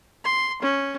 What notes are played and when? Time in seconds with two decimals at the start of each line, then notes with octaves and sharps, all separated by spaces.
0.24 C6
0.62 C#4